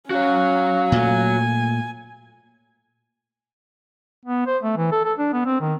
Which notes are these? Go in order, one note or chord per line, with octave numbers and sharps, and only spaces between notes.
C#4 F#4 C#5 F5
A#2 A3 G#5
B3
C5
A3
E3
A4
A4
D4
B3
C4
D#3